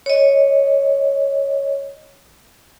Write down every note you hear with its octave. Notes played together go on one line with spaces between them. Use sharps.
C#5 D#5